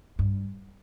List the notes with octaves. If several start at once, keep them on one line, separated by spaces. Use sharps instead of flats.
G2